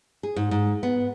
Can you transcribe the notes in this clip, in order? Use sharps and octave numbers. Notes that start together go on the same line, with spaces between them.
G#4
G#2
G#2
B3